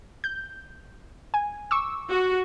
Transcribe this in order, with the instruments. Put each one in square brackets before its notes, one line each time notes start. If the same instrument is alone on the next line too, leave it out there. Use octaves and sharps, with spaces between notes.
[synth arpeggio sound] G6
G#5
C#6 D6 E6
[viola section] F#4